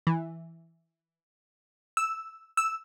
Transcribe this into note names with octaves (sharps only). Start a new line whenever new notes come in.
E3
E6
E6